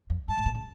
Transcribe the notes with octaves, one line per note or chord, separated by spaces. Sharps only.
F2
G2 A5
A2
A#2
C#3